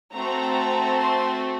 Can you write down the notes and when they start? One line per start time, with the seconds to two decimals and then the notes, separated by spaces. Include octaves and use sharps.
0.13 A3 C4 F#4 A4 A#5
0.98 C6